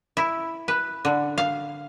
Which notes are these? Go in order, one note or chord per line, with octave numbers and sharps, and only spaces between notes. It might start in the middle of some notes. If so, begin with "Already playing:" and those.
E4
B4
D3
F5